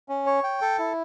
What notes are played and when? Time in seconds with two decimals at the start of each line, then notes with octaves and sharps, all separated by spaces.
0.09 C#4
0.26 C#5
0.44 G5
0.61 A4
0.79 E4